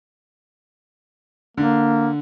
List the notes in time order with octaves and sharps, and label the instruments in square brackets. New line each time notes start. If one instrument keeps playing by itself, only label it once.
[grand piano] D3 [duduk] A#3